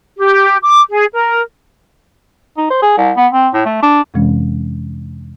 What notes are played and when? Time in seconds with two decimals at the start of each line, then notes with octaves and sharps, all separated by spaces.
0.17 G4
0.63 D6
0.89 G#4
1.13 A#4
2.57 D#4
2.70 C5
2.82 G#4
2.97 C2
3.17 B3
3.33 C4
3.54 A2
3.66 A3
3.83 D4
4.14 F2 C3 E3 G#3 C4 C#4